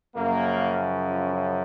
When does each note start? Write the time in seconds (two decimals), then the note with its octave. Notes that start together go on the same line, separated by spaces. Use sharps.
0.15 F#2 C#3 F3 A#3
1.01 F4
1.29 C#4